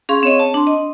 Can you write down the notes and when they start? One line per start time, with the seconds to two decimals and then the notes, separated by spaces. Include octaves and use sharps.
0.09 C#4 G#4 F5 C6 C#6
0.23 C4 C#5 D#5
0.39 A5
0.54 D4 C6
0.67 D#5